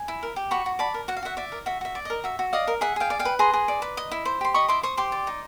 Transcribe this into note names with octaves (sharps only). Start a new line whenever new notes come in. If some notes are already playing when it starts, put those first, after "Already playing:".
Already playing: G#5
E4
A#4
G4
F#4 B5 C#6
F#4
D5 A5 B5
A#4
F#4 F#5
F5
F#4 E5 F#5
D5 E5
A#4
F#4 E5
F#4 E5
D5
A#4 D#5
F#4 E5
F#4
D5 D#5 F5
A#4
G#4 E5 F#5
G#4 F5 G5
D5
F5 G5
B4
G#4 A#5 C6
G#4
D5
B4
D#5
E4
C5
G4 C6
D#5 B5 C#6
E4 C6 D6
C5 C#6 D#6
G4 C6 D6
D5
D#4